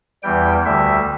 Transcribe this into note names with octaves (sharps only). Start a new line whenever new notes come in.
E2 E3 G3 G5
D2 D3 G3 E5